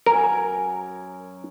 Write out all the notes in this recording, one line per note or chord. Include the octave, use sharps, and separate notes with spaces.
F#2 A#4 G#5